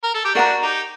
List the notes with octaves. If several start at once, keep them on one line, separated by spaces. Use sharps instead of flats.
A#4
A4
G4
D4 F#4 A#4 F#5 A#5
D#4 G4